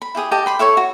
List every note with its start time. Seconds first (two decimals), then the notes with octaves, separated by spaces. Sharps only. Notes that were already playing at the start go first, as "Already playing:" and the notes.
0.02 B5
0.15 E4 G4 G#4 D#6
0.31 G4 D#5 G5 A5
0.46 G5 B5 C6
0.59 E4 A4 C#5 C#6
0.77 F#4